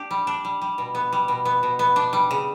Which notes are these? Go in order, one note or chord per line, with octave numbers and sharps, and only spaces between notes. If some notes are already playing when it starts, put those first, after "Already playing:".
Already playing: D4 G4
G3
D4
G3
G3
B2
B3
G3
B2
B3
B2
B3
D4
G3
C#3